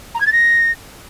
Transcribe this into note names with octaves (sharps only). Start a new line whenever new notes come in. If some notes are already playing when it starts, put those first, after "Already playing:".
A#5
G#6
A6
A#6